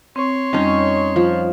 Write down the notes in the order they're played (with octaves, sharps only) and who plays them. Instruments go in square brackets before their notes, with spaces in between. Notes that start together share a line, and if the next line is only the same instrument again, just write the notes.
[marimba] C4 C#6 [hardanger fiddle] C#5 C6
[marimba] F2 G3 [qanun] C#4 D#4
[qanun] F3